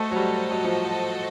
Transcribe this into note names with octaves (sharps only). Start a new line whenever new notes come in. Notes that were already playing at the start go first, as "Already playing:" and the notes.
Already playing: A3 F#4 A4 C5 D#5
F#3
G3
F#3
F3